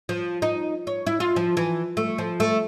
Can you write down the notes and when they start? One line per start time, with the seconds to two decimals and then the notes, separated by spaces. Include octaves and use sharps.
0.09 F3
0.42 D#4
0.87 C#5
1.06 E4
1.20 F4
1.36 F3
1.57 E3
1.97 A3
2.18 F3
2.40 A3